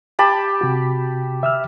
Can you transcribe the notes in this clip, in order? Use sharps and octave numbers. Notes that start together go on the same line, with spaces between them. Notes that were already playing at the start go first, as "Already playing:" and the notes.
G4 A5 B5
C3 F#4
E5 E6 F6